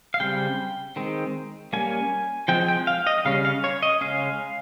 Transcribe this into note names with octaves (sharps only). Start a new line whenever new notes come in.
F5
C#3 G3 C4 G5
D#3 G#3 C4
G3 A#3 C#4 G#5
F3 G#3 C4 G5
G5
F5
D#5
C#3 G3 C#4 F5
F5
C#5
D#5
C#3 G#3 C#4 F5